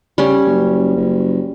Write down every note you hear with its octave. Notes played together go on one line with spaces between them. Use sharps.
C#3 G3 C#4
F#1
F#1